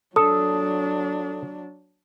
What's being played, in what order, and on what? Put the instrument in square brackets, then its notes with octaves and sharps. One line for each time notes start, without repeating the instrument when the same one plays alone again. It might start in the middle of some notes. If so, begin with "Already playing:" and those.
[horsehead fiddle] F#3 D4 [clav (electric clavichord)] A4 [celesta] D#6